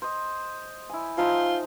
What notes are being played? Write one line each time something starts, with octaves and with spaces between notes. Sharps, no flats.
C5 D#5
E4 G#5
F3 D#4 F4 E5